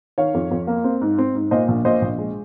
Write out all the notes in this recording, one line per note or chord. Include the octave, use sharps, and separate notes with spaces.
D#3 C#5 F5
F2
F2
A#3
C4
G#2
C4
G#2
A#2 C5 D#5
A#1
A#2 C5 D#5
A#1
G#3